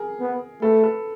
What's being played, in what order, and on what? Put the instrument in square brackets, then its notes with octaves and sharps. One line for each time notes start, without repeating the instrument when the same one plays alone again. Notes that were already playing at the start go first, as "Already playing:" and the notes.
Already playing: [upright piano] G#4 A#4
[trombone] B3
[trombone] A3 [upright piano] A4 B4
[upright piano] A4 B4